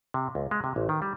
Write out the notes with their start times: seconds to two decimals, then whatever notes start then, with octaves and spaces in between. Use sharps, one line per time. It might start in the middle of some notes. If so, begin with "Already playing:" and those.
0.14 C3
0.35 C#2
0.51 G#3
0.64 C3
0.76 A1
0.89 D#3
1.02 G3